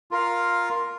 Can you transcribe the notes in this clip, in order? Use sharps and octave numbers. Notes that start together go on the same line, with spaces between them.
F4 A#4 F5